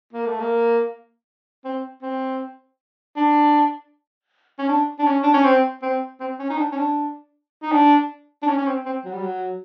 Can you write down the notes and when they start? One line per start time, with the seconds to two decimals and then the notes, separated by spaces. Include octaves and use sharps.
0.13 A#3
0.26 A3
0.40 A#3
1.65 C4
2.03 C4
3.16 D4
4.59 C#4
4.69 D4
4.99 D4
5.07 C#4
5.23 D4
5.34 C#4
5.44 C4
5.82 C4
6.20 C4
6.39 C#4
6.50 D#4
6.58 D4
6.72 C#4
6.77 D4
7.63 D#4
7.72 D4
8.42 D4
8.48 C#4
8.58 C#4
8.67 C4
8.86 C4
9.05 F#3
9.13 G3
9.22 F#3